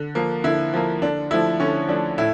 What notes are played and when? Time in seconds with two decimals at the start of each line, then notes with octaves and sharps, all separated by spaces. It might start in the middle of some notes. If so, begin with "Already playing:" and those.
Already playing: D3
0.15 F3 A#3
0.44 D3 E4
0.74 F3 A#3
1.02 D3 D4
1.31 F3 A3 E4
1.60 D3 C#4
1.89 F3 A3 D4
2.18 A2 E4